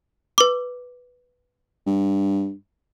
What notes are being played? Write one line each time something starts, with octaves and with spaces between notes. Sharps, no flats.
B4 D6
G2